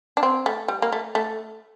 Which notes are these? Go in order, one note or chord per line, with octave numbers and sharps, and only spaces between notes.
D4
C4
A3
G3
A#3
A3
A3